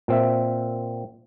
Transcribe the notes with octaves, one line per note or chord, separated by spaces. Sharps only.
A#2 C4 E5